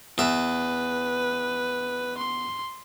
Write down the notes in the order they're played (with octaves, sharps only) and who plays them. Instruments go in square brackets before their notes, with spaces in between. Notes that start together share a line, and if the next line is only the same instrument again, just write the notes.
[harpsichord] E2 E5 [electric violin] B4
[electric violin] C6